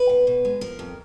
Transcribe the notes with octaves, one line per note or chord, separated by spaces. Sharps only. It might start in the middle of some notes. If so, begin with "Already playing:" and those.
Already playing: B4
B2
B2
G#3
F3 A#4
F2